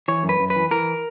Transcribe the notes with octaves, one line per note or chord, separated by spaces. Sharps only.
E3 C#5
F#2
B4
F#2
B4
E3
E3 A#4